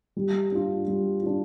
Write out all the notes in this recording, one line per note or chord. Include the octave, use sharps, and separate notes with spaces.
G3
D4 F4
G3
D4 F4